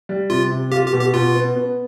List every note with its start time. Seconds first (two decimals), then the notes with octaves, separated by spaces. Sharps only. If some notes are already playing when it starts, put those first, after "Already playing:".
0.09 G3
0.30 C3 F4
0.51 C3
0.72 F4 G4
0.86 G4
0.93 B2
1.00 G4
1.14 B2 F4
1.35 B3
1.55 B3